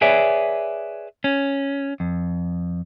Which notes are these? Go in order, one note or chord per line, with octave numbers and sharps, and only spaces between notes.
G#4 B4 C#5 D5 E5 G#5
C#4
F2